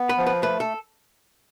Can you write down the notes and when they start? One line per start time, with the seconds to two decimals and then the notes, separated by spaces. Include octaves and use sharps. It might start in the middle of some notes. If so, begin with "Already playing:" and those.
Already playing: B3
0.09 B4
0.18 F3
0.26 B4
0.43 A3 B4
0.60 A4